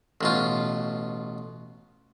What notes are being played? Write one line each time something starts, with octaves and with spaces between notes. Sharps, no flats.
A1 B2 F4